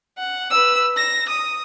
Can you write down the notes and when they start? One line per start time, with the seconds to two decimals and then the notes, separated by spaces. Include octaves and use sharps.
0.18 F#5
0.51 B4 E6
0.97 A#6
1.29 D#6